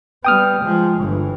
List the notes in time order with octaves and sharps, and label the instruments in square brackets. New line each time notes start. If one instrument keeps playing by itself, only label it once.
[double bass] G3 B3 [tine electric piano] G5 D#6 F6
[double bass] F3 G#3
G1 E3